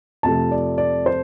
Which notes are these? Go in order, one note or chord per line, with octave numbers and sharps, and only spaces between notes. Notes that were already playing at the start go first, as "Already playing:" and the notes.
F2 C3 F3 A3 A5
D5
D5
C5